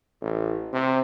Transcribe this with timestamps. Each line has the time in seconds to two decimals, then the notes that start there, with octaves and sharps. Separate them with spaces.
0.21 A1
0.73 C3